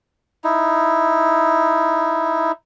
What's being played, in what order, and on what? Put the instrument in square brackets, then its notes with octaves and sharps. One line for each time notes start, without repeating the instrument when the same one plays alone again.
[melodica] D#4 E4